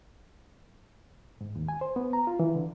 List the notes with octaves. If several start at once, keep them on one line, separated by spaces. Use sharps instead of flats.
G#2
D#2
G#5
C5
B3
A#5
F4
E3
D3